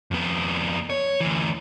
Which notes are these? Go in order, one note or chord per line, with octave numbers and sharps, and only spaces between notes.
F2 B3
C#5
D2 E3